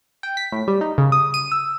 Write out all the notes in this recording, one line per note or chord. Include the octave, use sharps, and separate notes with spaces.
G5
B6
A2
G3
D#4
C#3
D#6
D#7
E6